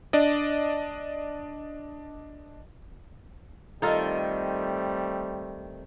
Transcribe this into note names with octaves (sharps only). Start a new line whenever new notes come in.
D4 D5 D#5
D#3 G3 A3 C4 D#4 F4 A4